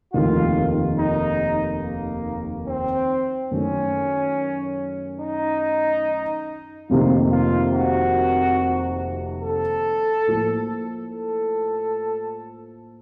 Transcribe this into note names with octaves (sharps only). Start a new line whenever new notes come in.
F1 D#2 D#3 F4
D#4
A#3
C4
F#2 D#3 A3 C#4
D#4
F1 F2 C3 D#3 A#3 F4
F4
F#4
A4
A2 F3 A#3 F4
A4